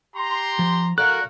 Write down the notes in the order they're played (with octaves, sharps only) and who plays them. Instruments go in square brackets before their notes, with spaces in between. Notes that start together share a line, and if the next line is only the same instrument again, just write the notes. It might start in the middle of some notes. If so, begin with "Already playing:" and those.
[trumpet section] G4 A#5 C6
[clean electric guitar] F3
[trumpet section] F#4 A#4 [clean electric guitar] A4 D5 F5 [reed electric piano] F#6